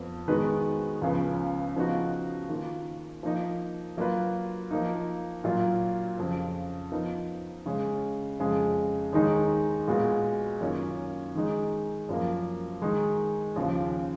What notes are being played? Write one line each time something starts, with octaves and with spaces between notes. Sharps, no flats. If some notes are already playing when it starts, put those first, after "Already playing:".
Already playing: F2 F3 B3
D#3 G#3 B3 F#4 B4
C#2 C#3 F3 B3
C#3 F3 B3 D#4 F#4
D#3 A#3 F4
F3 A#3 D#4 A#4 D#5
F#3 A#3 F4 B4
F3 A#3 D#4
A#2 F#3 A#3 F4
F2 C#3 F3
F3 B3 D#4 A#4
C#3 G#3 C#4
F2 C#3 G#3
D#2 D#3 G#3 D#4
A#2 G#3 B3 F#4
F#2 D#3 A#3 C#4 F4
D#3 G#3 D#4
F#2 F3 A#3
D#3 G#3 D#4
D#2 C#3 F3